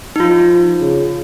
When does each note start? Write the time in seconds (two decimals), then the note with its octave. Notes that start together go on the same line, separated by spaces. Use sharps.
0.16 D#4
0.20 F3 F4
0.81 C#3